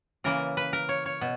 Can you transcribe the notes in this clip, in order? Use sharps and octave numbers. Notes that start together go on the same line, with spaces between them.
C#3 E3 A#3 A#4
B4
A#4
C#5
C#5
B2